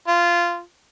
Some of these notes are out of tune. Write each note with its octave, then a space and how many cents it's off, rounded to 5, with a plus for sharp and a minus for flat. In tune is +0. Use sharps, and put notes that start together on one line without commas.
F4 -15